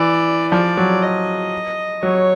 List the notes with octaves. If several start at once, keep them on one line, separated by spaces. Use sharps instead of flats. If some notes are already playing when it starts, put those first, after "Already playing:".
Already playing: E3 D5
F3 D5
F#3
D#5
F#3 C#5